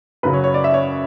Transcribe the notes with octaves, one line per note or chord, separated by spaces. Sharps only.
F#2 C#3 F#3 B4
C#5
C#5
D5
E5
C#5